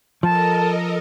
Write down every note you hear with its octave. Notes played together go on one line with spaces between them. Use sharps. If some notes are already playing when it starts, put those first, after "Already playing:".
F3 A4 A#4 D#5 A5